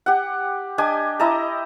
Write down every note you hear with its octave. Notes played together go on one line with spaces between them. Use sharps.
G4 F#5
D4 G4 D#5 G#5
E4 D#5 A5 A#5